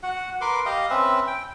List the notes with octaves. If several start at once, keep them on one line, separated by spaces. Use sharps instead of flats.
F#4 F#5
A#4 B4 C6 D6
G4 D#5 F5
C4 C#4 B4 E5
G5